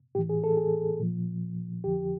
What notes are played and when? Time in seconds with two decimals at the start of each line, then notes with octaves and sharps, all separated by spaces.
0.15 A2 E3 G4
0.29 G#4
0.44 A4
0.57 G#4
1.00 A#2 F3
1.84 F2 D3 F3 G4